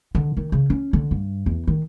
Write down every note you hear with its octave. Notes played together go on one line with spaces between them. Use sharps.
D3
D#3
C#3
C#4
D3
G2
E2
D#3